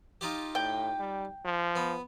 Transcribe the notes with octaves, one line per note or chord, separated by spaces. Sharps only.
D#4 F4 G4
A2 G5
G3
F3
B3